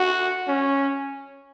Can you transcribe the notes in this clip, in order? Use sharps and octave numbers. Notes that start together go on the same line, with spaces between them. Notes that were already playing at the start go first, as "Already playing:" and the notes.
Already playing: F#4
C#4